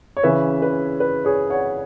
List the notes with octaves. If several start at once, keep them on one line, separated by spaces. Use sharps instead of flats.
C#5
C#3 E3 C#4 B4 E5
B4
B4
G#4 C#5
C#5 F#5